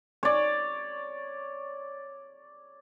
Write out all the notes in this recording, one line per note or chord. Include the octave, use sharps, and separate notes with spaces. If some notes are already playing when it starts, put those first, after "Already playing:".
C#5 D5